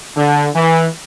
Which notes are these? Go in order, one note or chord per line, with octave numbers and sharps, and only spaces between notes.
D3
E3